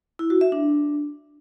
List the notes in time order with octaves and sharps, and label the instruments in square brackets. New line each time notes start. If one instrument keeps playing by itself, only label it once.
[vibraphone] E4
F#4
E5
D4